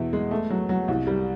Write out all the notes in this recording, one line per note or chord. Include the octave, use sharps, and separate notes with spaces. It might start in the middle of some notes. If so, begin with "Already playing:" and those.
Already playing: E2 B2 E5
G#3
A3
F#3
F#3
C2
G3